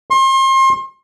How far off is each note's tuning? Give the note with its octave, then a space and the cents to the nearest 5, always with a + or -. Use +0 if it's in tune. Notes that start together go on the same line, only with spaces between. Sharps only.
C6 +35